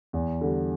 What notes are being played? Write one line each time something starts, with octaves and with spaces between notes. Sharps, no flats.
E2
D3 G3